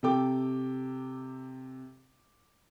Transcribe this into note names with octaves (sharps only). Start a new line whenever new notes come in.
C3 A4 G5 D6